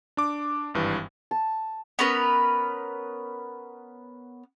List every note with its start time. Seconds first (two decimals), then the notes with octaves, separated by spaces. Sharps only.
0.17 D4 D6
0.74 G#1 G2 E3
1.31 A5
1.99 B3 C#4 A#4 B4